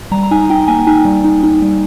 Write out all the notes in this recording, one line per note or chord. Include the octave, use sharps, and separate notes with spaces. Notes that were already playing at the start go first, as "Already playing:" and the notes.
G3 A#5
A#5
D#4 G#5
D#4 G5
A#3 G#5
D#4 G#5
G3
D#4
D#4
G3